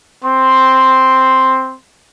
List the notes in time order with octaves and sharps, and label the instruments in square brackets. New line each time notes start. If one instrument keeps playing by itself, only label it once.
[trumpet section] C4 C6